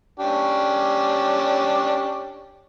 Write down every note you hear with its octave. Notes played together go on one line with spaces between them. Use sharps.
C#4 D4 G4